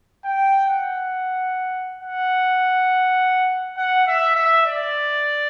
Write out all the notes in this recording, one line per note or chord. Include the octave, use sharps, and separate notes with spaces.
G5
F#5
F#5
F#5
E5
E5
D5